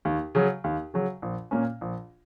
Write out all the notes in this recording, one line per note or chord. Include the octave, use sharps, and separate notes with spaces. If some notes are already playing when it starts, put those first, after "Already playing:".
D#2
C#3 F#3
D#2
C#3 F#3
A#1
A#2 A#3 C#4
A#1